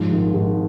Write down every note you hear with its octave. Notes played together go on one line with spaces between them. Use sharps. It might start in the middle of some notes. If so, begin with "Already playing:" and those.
Already playing: G#2 F3
G#1
G#1